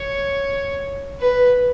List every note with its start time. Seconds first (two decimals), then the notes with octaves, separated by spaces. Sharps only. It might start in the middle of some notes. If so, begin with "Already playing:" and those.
Already playing: C#5
1.20 B4